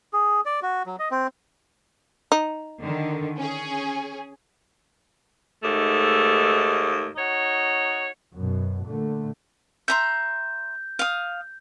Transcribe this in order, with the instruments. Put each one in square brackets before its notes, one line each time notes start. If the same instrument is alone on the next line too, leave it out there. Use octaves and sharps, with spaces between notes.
[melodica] G#4
D5
F#4
F#3
D#5
C4
[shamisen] D#4
[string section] D3 D#3
C#4 G#4
[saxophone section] D#2 G#2 A3
D#4 F#4 C#5
[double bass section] F#2 B2
A#2 D3 A3
[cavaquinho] E5 A#5 C6 [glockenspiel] G6
[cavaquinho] F5 D#6